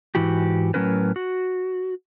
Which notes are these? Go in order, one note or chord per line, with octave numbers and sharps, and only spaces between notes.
G#2 E3 E4 F#4 G4
A2 F#3 A#3 C#4 A#4 B4
F#4